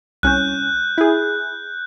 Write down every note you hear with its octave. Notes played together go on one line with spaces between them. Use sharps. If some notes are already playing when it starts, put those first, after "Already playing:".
C2 C#4 F#6 G6
E4 G#4